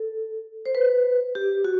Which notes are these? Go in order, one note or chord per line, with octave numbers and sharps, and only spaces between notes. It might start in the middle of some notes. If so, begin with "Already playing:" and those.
Already playing: A4
C5
B4
G4
F#4